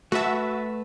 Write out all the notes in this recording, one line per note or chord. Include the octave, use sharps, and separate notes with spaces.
A3 F#4 B4 E5 A5